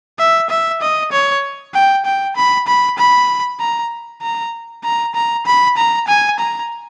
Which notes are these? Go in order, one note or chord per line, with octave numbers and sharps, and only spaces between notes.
E5
E5
D#5
C#5
G5
G5
B5
B5
B5
A#5
A#5
A#5
A#5
B5
A#5
G#5
A#5